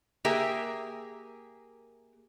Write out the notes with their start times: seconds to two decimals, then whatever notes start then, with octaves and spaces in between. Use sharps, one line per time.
0.25 A#3 G4 G#4 A#4 E5